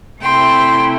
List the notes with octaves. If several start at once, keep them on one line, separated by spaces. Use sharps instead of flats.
C3 A3 E4 G5 C6